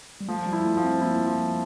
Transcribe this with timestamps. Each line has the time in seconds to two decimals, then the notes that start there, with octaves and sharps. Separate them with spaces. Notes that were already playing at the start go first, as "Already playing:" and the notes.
0.21 G3
0.28 F3 A3
0.46 G3
0.53 E4
0.65 A3
0.77 F3
0.84 C4
1.02 A#3 E4
1.26 F3